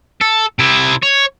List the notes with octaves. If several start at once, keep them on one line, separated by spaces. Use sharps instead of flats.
A4
C3 E4
C#5